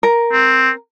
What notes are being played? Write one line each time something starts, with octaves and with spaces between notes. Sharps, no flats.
A#4
C4